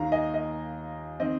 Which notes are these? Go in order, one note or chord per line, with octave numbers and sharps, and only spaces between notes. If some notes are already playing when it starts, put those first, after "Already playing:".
Already playing: D#2 D#3 A#3 F5 A#5
D#5 G#5
D#5
D#3 C4 D#5